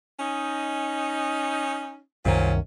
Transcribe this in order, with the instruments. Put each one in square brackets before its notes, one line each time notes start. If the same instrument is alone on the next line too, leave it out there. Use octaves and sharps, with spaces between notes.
[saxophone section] C#4 D#4
[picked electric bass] C2 F#2 D#3 [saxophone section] A#2 C4 C#4